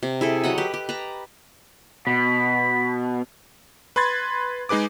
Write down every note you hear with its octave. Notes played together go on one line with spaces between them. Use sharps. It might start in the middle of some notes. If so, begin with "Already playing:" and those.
C3
E4 G#4 A4
F#3 D#5 F#5 B5
G4 B4
G4
B4 A5 A#5
B2 B5
B4 B5 C6 G#6 A6
G#3 D#4 G#4 B4 D6